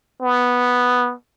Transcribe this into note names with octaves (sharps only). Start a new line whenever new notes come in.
B3